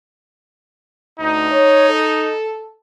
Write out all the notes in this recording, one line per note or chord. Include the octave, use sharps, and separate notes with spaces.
D2 D#4
C#5
A4